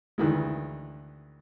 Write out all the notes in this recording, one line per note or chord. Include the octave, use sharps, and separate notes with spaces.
D2 D#3 E3 G#3